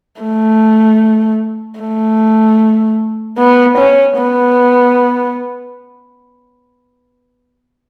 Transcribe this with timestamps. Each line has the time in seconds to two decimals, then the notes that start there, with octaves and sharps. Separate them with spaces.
0.21 A3
1.80 A3
3.39 B3
3.78 C#4
4.18 B3